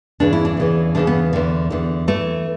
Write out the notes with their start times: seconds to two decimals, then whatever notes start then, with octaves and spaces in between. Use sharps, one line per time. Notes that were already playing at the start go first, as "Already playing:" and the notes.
0.20 E2 C#3 E3 D4
0.33 E4
0.45 D4
0.57 E2 C#3 E3
0.95 E2 C#3 E3 D4
1.07 B3
1.33 E2 D3
1.70 E2 D3
2.08 E3 A3